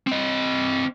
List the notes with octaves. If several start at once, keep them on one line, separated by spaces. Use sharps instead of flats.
C4 D#5